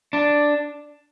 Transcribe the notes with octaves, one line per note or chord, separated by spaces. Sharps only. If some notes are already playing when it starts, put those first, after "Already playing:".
D4